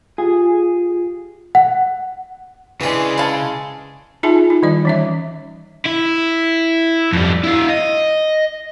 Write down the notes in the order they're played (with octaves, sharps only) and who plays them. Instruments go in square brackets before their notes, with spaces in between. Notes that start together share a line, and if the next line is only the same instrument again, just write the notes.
[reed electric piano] F4 G4 [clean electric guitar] G#4
[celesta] F#5
[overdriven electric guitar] C#3 [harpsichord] E3 D4 [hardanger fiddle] G#3
[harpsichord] E4 [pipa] B4 F5 A5
[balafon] D#4 F4 G#4 E5 G#5 A5
D#4
D#3 G3 D5
E3 C#4 E5
[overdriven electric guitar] E4
F2 G3
E4 F5
D#5